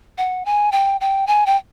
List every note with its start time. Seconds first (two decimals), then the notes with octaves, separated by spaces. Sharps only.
0.18 F#5
0.45 G#5
0.72 G5
1.01 G5
1.27 G#5
1.46 G5